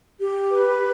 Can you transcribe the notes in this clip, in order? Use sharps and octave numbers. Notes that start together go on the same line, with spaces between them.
G4
B4